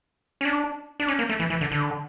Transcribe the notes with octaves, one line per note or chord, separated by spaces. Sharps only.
C#4
D4
D4
C#4
A#3
A3
E3
E3
D3
D3